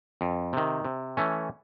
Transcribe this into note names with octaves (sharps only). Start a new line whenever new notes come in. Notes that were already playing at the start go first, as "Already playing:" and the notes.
F2
C3 D#3
C3
E3 A3 C#4